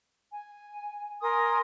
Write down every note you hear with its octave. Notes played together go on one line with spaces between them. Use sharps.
G#5
A#4 G#5 C6 D#6